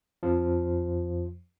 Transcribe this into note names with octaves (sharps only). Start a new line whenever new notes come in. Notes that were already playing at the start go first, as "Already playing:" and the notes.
F2 F3